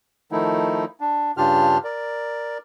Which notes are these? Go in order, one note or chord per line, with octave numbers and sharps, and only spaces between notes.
D#3 F3 A3 D#4 E4
D4
G2 C#3 D4 F4 G4 F6
A#4 D5